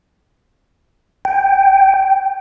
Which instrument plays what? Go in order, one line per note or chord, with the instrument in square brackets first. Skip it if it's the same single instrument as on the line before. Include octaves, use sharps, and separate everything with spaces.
[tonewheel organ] G5